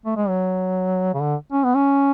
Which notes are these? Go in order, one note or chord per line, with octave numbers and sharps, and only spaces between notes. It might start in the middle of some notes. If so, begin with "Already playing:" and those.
A3
G#3
F#3
C#3
D3
C#4
B3
C#4